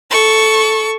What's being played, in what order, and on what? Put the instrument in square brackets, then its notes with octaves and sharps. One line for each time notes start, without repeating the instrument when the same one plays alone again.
[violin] A4 C#6